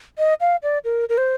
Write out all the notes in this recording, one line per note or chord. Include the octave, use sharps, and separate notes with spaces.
D#5
F5
D5
A#4
A#4
C5